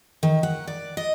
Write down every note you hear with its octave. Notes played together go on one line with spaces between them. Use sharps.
D#3
F#5
D5
D#5